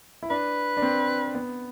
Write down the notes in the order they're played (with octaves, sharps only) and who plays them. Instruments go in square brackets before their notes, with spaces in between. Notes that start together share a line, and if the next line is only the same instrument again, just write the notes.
[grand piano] E4
[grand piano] D4 [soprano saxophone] B4
[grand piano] D4
C4
B3